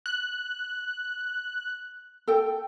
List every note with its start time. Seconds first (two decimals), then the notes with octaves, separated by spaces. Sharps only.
0.06 F#6
2.27 A4 G5